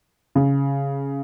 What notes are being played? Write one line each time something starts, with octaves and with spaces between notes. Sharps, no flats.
C#3